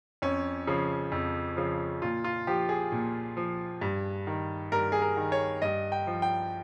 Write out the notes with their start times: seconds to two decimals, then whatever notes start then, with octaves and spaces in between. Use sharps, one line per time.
0.22 F2 C#4
0.67 C#3 F3
1.12 F2
1.57 C#3 F3
2.02 A#2 F4
2.24 F4
2.47 F3 G4
2.69 G#4
2.92 A#2
3.37 F3
3.81 G2
4.27 D#3
4.72 G2 A#4
4.92 G#4
5.02 A#4
5.17 D#3
5.32 C#5
5.62 G2 D#5
5.92 G5
6.07 F3
6.22 G5